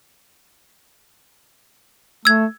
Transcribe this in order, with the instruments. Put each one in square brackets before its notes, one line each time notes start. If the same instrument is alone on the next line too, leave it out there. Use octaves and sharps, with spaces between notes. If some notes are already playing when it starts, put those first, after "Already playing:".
[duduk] A3 [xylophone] E6 G#6